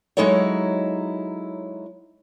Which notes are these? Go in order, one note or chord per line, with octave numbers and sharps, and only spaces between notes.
F#3 G#3 D#4 E4 A4 C#5